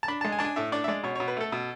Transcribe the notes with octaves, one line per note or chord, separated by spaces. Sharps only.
A5
D4 B5
A5
G#3
G#5
D4 A5
G#5
A2 E5
D4 D5
E5
G#3 D5
B2 C#5
C#5
B2
B4
A3 A4
B2